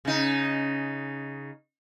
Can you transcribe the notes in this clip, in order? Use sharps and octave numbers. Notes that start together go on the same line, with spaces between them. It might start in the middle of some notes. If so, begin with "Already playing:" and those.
C#3 D#4